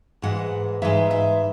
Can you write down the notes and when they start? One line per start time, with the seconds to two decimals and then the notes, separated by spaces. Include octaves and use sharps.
0.22 G#2 E3 G#3 F#5
0.82 G#2 E3 G#3 E5
1.11 E5